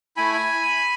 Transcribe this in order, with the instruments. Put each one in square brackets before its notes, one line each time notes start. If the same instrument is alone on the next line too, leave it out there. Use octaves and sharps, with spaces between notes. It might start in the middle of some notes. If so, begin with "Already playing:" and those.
[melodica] A3 E4 G#5 B5